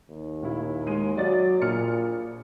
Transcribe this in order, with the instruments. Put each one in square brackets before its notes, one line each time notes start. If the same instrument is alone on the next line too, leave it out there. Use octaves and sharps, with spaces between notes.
[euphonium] D#2
[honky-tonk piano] A#2 E4
G#3 D#7
[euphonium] F#3 [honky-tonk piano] D5 D#5 A6
[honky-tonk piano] A#1 F6 C#7 [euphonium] A#2